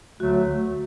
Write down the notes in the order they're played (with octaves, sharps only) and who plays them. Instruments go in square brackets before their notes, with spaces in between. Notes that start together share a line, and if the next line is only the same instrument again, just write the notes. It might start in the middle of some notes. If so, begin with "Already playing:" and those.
[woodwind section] D2 D3 F#3 A3 [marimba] F#4